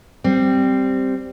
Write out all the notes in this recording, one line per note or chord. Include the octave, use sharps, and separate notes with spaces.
G3 C4